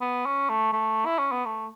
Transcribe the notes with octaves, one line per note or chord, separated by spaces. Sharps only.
B3
C#4
A3
A3
E4
C#4
B3
A3